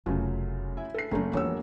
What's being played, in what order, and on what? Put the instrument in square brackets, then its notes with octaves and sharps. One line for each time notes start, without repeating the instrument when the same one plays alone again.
[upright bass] F1 [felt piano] F#2 C#3 F4 [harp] F#3 A3
[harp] E4 E5 G#5
[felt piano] A4 C7
[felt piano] F#1 A3 A#5 [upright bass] F#2 F#3 [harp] A#3
[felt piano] E1 C#5 E6 [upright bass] F3